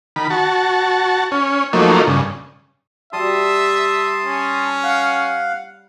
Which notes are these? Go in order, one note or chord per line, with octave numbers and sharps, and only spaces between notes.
D#3 B5
F#4 A5
C#4
F3 F#3 A3 A#3 D#4
G2 C#3
G3 E5 A5 C6 D#6
C#4
F5 F#5